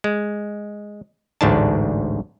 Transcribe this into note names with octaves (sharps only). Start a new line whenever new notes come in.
G#3
A1 D2 G#2 D4 A5